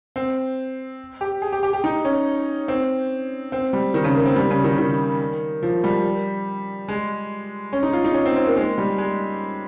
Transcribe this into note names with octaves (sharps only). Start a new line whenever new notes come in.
C4
G4
G#4
G4
G4
G4
D#4
C#4
C4
C4
G3
D#3
C#3
A#3
C4
G3
C#3
D#3
D#3
F3
G3
G#3
C#4
D#4
F4
D#4
C#4
C4
C4
A#3
G#3
G3
G#3